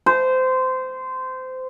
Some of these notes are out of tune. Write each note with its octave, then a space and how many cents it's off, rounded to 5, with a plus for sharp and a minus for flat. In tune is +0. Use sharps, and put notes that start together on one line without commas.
C5 -20